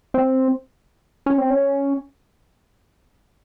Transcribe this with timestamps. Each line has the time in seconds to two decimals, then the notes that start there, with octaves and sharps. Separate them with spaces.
0.14 C4
1.26 C#4
1.38 C4
1.50 C#4